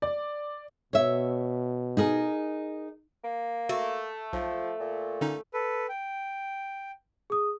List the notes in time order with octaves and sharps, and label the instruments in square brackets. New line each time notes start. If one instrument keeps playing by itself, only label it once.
[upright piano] D5
[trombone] B2 [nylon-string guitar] C#5 E5
[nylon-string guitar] D#4 G#4 A#4
[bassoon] A#3
[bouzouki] A3 [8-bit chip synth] F#4
[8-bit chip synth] B1 [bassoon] F3
[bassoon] A#2
[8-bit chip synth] D3 C#4 D#4
[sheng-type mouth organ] A4 B4
G5
[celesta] G#4 D#6